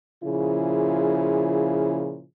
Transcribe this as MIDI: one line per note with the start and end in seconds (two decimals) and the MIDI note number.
0.24 2.24 46
0.24 2.24 49
0.24 2.24 53
0.24 2.24 64
0.24 2.24 65
0.24 2.24 68